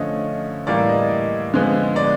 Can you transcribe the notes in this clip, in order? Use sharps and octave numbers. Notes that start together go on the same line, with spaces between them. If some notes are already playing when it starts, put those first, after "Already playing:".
Already playing: D3 F3 A3 C#4 D#5
A2 E3 G3 A#3 D5
D#5
D3 F3 G#3 B3
D5